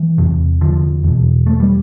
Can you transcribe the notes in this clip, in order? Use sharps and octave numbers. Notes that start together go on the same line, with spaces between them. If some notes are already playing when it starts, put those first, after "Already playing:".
Already playing: E3
E2 C3
D3 F3
E2 B2
A3
G3